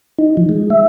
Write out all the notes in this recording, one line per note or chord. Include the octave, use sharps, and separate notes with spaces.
D#4
F3
G#3
E5